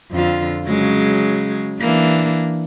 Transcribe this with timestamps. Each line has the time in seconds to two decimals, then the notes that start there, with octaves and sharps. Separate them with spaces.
0.11 F2 D3 F4
0.66 C#3 F#3 G#3
1.80 E3 A#3 D4